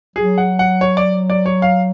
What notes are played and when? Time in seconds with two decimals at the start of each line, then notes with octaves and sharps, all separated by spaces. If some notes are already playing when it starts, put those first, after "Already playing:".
0.16 F#3 G#4
0.38 F#5
0.59 F#5
0.81 C#5
0.97 D5
1.30 D5
1.46 C#5
1.62 F5